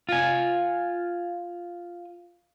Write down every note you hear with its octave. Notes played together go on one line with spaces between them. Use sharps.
F4 G#5